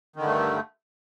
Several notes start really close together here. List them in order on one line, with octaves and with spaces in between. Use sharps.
D#3 D3 G2 A3